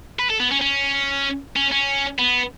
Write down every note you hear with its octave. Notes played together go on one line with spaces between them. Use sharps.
B4
A4
B3
C#4
C#4
C#4
C#4
B3